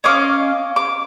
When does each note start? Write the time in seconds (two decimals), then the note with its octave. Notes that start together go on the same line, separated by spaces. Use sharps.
0.04 C#4 D#5 F5 D6
0.76 D6